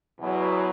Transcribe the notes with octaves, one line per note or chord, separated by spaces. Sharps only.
E2 B2 F#3